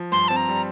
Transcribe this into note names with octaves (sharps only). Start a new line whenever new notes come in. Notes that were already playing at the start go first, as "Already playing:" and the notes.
Already playing: F3
G2 C6
C4 A5
A#5
G3